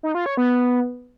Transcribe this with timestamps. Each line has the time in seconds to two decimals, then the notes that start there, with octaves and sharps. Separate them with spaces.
0.03 D#4
0.15 F4
0.26 C#5
0.37 B3